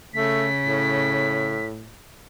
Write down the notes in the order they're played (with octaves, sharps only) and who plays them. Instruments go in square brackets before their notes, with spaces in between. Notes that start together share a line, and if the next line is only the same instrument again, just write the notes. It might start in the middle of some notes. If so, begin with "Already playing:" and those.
[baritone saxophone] C#3 [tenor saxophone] A3 [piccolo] B6
[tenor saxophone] A2